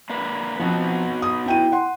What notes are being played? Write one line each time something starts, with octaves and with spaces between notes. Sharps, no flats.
D3 A#3 B4
F3 B3 C4 D#4 F#4
D#6
E4 G5 D#7
F#5 C6